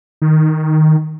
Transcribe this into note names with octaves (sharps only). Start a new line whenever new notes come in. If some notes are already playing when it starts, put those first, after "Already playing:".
D#3